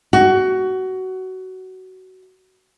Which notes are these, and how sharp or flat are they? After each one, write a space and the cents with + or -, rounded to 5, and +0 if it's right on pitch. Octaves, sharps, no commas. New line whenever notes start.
F#4 +20